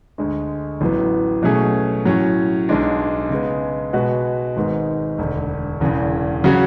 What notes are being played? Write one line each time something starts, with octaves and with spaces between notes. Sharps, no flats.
D2 D3 G#3
A1 A2 F#3 B3
B2 F#3 A3 C#4 G#4
A2 F#3 C#4
B1 B2 G#3 D4
C#3 G#3 B3
B2 G#3 B3 F#4 B4
G#1 G#2 G#3 B3
E1 D2 D3
E1 E2 C#3
C#3 F#3 C#4 F#4